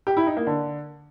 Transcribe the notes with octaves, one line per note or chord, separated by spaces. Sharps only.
G4
E4
D#4
A#3
D3